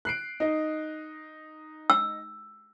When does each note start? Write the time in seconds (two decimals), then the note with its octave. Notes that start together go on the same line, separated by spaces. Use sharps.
0.05 F#6 C7 D7
0.40 D#4 D#5
1.90 E6